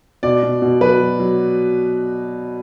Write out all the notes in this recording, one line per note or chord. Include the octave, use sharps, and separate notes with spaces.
B2 D5
B2
B2
F#3 B4
F#3
F#3